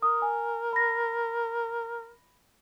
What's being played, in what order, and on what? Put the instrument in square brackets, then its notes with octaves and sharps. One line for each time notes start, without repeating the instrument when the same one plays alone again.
[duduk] A#4 [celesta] D#6
[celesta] G#5
B5 A#6